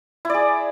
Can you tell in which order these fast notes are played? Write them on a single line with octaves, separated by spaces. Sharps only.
E4 D5 G#4